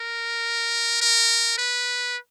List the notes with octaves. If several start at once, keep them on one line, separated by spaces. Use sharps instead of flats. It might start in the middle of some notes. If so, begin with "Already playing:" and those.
Already playing: A#4
A#4
B4